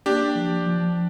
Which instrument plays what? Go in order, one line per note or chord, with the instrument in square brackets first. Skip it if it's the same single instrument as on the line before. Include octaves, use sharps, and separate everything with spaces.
[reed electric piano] A#3 [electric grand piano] D4 G4
[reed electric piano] F3
F3